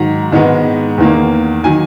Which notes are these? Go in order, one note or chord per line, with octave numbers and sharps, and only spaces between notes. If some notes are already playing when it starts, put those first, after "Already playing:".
Already playing: G#2 D#3 F#3 A#5
G#2 D#3 G#3 B3
E2 D#3 A#3
D#3 F#3 G#5